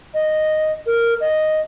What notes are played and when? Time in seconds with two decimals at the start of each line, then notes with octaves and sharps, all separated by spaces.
0.14 D#5
0.86 A#4
1.20 D#5